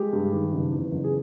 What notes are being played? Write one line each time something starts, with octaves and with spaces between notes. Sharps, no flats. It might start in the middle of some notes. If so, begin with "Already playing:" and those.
Already playing: G#3 G4
G2
D#3
F#1
E2
F#1
G#4